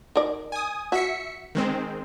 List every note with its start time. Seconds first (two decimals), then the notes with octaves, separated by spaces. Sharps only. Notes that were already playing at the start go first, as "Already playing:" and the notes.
0.16 D#3 A#4 D5
0.52 G#5 D#6
0.92 F#4 E5 B6 C#7
1.55 D#3 G#3 C4